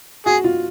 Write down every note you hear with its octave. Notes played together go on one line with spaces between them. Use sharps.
F#4 G#4
F4